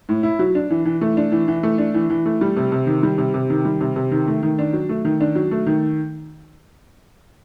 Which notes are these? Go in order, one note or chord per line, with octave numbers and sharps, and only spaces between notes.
A2
E4
F#3
D4
E3
E3
A3
D4
E3
E3
A3
D4
E3
E3
A3
G3
C3
C3
D#3
G3
C3
C3
D#3
G3
C3
C3
D#3
A3
D#3
D4
F#3
A3
D#3
D4
F#3
A3
D#3